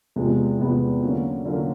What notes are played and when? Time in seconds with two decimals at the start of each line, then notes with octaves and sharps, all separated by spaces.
0.16 E2 C3 F3 G#3 B3
0.59 E2 C3 F3 G#3 B3
1.03 D3 F#3 A#3 C#4
1.45 D3 F#3 A#3 C#4